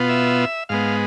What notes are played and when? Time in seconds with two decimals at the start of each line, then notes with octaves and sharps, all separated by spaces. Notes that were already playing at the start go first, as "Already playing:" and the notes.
Already playing: B2 B3 F4
0.09 E5
0.69 G#2 G#3 B3 F5